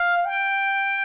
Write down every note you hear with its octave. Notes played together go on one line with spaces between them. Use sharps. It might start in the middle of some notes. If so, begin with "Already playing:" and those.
Already playing: F5
G5